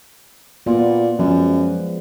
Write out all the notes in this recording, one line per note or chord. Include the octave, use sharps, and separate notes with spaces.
A#2 B3 F#4 D5
F#2 F3 G#3